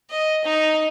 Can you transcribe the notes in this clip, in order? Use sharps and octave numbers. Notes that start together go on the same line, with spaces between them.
D#5
D#4